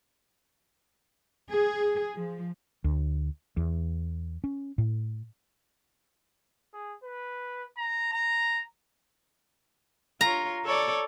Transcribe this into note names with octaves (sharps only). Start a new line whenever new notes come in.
G#4
F3
D2
E2
C#4
A2
G#4
B4
A#5
A#5
F4 C#5 A#5
A4 C#5 D5